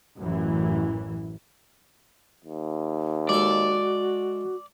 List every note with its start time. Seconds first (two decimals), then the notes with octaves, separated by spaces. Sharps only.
0.18 A1 F#2 E3
2.45 D#2
3.29 G#3 F#4 A4 D5